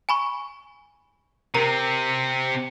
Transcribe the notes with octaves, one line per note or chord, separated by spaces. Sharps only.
G#5 B5 C#6
C3 C4 A#4 A#5